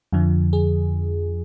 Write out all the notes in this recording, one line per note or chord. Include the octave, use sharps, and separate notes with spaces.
F2 D3 F3
G#4